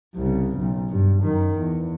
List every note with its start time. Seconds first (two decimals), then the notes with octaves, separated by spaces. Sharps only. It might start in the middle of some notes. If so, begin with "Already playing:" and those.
0.16 C2 C#3
0.58 B1
0.89 G2
1.24 F#2 D#3
1.58 E2